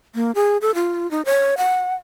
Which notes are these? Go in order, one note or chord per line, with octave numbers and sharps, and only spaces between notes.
A#3
G#4
A4
F4
D#4
C#5
F#5